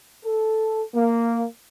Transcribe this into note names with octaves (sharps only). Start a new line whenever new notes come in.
A4
A#3